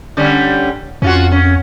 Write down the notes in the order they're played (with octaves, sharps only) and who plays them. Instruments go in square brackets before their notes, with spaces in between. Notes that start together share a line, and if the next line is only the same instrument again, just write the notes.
[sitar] D3 G3 C#4
[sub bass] F2 [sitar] C#4 F4 F#4
[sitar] C#4